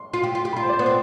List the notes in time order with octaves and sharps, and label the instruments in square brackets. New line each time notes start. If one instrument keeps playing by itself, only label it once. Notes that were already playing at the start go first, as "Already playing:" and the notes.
Already playing: [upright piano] C6
[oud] F4
G4
F4
G4
[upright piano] B5
[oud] F4
[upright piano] C5
D5
C5
[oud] B3
[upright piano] D5
[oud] C4